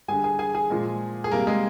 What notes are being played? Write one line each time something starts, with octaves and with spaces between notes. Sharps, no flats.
D3 G3 G#4 G#5
G#4 G#5
G#4 G#5
G#4 G#5
A#2 F3 G#3
G#4
C3 G3 A#3 A#4
G#3 G#4